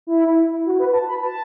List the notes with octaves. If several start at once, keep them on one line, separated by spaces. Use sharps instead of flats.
E4
F#4
B4
A5
B5
A5